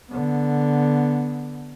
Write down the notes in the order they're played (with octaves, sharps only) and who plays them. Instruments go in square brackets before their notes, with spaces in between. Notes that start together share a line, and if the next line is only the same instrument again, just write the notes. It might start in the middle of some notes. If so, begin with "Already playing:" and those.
[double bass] D3 B3